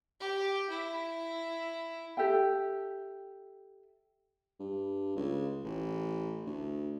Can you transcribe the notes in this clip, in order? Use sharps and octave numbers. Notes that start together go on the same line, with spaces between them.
G4
E4
G4 A4 E5 G5
G2
C#2
A1
D2